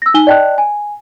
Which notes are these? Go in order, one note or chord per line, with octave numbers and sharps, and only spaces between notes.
E6 A#6
D#4 G#5 G7
D5 D#5 G5 A5 F#6
G#5